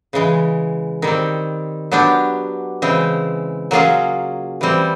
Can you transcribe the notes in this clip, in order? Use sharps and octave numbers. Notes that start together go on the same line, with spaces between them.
C#3 E3 G#3
D#3 G3 C4
F#3 B3 D4 G4
C#3 E3 G#3 C4
F#3 A#3 C#4 F4 G#4
E3 G3 C4